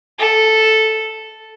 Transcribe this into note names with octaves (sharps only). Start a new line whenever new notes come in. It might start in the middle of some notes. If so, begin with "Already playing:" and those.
A4